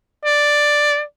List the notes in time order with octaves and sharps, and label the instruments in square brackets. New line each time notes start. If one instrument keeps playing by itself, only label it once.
[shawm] D5